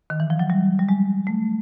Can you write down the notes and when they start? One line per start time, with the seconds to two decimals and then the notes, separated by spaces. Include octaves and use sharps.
0.10 D#3
0.20 E3
0.30 F3
0.39 F#3
0.50 G3
0.79 G3
0.89 G#3
1.27 A3